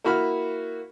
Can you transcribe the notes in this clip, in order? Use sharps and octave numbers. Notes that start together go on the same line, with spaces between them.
A#3 E4 F#4 B5 F6